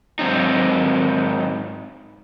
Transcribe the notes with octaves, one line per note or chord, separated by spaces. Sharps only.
G#2 F#3 C4 D#4